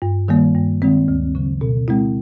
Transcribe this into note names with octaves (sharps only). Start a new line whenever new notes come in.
G2
D#3 G3 A#3
G2
D#3 G#3 C4
D2
C#3 F#3
B2
G#3 C4 E4